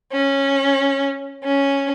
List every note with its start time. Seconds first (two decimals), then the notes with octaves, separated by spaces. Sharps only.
0.12 C#4
1.44 C#4